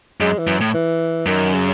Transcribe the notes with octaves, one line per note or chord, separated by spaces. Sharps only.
F#2 G#3
E3
F#2
A2
E3
F#2 D#3
C#3